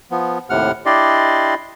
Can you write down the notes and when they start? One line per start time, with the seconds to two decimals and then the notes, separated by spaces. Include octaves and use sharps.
0.11 F3 B3
0.50 D#2 A2 C3 F#5 F6
0.86 D4 E4 G4 D5 D#5 C6